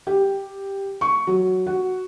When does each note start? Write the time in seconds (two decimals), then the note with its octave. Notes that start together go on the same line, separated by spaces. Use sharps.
0.07 G4
1.01 C#6
1.27 F#3
1.66 F#4